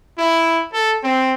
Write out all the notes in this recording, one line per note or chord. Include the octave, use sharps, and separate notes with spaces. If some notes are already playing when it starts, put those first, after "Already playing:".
E4
A4
C4